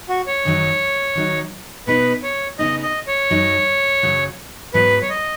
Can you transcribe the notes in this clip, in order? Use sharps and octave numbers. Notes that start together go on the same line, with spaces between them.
F#4
C#5
F#2 D#3 F#3 D#4
D#3 F#3 D#4
B2 B3 D#4 B4
C#5
C#3 B3 D#4 D#5
D#5
C#5
F#2 F#3 D#4
F#2 C#3 F#3
G#2 F#3 B3 B4
C#5
D#5